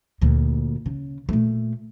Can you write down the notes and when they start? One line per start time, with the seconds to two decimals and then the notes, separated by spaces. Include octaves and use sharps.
0.22 D2 A#2
0.86 C#3
1.29 A#2 A3